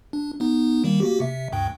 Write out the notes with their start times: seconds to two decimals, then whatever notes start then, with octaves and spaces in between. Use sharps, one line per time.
0.13 D4
0.40 B3 D#4
0.84 D#3 G3 A#3
1.00 A#3 F#4 G4
1.20 C3 E5
1.52 D2 G2 G5